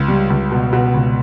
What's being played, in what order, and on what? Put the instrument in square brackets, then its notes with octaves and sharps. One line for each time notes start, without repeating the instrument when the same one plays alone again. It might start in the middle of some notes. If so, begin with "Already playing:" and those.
Already playing: [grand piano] C#2
G3
C#2
B2
B2
C#2